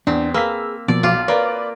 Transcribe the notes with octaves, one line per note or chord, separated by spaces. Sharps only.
E2 C4 D4
A#3 G#4 B4 E6 B6
B2 F3 A#3 D5
B1 F4 D5 D6
A#3 B4 C#5 D5 D7